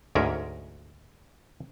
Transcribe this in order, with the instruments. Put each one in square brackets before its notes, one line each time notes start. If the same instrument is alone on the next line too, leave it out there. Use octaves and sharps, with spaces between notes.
[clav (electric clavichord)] D2 G#2 C#4 A#4